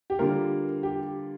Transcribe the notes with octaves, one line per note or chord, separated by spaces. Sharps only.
G4
D3 G3 A#3 F4 A#4
G4